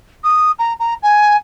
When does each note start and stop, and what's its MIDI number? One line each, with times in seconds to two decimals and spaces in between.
0.24 0.51 87
0.59 0.73 82
0.80 0.94 82
1.03 1.36 80